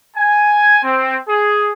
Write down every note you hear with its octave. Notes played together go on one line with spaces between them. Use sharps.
G#5
C4
G#4